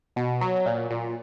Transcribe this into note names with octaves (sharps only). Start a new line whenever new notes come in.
B2
F#3
A#2
A#2